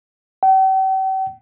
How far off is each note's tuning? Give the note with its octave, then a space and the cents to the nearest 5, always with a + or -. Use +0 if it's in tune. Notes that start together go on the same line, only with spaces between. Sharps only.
G5 -45